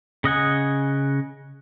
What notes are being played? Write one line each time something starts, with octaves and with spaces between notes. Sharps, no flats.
C#3 D#5 F#5 G#5